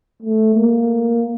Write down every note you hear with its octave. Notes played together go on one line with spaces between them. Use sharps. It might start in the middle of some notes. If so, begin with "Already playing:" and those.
A3
A#3